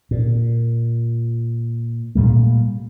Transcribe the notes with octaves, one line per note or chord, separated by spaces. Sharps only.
A#2
A#2 G3 A3